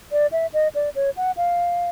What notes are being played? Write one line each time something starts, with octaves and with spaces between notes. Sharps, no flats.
D5
E5
D#5
D5
C#5
F#5
F5